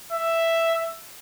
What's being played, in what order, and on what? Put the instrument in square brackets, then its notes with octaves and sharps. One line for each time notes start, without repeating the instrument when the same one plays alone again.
[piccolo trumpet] E5